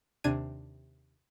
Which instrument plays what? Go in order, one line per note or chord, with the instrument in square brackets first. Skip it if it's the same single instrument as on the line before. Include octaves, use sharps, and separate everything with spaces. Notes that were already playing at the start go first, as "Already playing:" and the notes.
[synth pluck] D#2 C3 D4 G#6 D#7